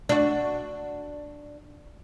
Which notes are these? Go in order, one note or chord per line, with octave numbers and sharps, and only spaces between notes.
D4 F#4